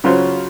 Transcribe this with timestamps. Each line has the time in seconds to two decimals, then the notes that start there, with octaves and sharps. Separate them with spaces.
0.04 C#3 F#3 C#4 F4 C5